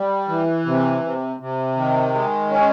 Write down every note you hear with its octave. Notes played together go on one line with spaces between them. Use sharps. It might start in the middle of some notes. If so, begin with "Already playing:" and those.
Already playing: G3
E3
C3
C3
C3
D#3
G#3
C#4